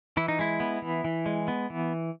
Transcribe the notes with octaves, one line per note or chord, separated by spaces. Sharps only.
E3 E4
D#4
G#3 E4
B3
E3
E3
G#3
B3
E3